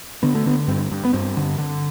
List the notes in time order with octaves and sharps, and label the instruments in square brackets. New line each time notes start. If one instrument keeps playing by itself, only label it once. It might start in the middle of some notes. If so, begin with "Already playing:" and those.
[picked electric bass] D3 B3
A3
D3 B3
G2 C4
G2
B3
G2 C4
D3
D3